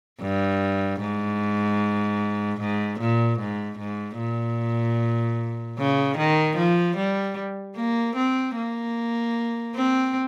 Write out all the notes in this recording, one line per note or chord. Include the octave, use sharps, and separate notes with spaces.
G2
G#2
G#2
A#2
G#2
G#2
A#2
C#3
D#3
F3
G3
A#3
C4
A#3
C4